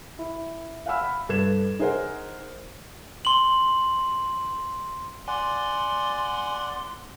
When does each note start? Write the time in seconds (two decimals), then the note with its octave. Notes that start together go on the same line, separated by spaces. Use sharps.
0.19 E4
0.86 F5 F#5 G#5 B5 E6 F6
1.01 B5
1.29 G2 A4 B4 G#6 E7
1.79 D#4 G#4 A#4 C5 F#5 G#5
3.25 C6 F#7
5.28 D5 F#5 G#5 C6